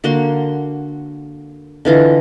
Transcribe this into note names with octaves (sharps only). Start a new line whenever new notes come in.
D3 A#3 F#4 C6
D3 E3 F4 D#5